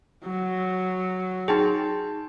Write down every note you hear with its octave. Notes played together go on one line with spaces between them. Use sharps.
F#3
D#4 G#4 G5 A5 C6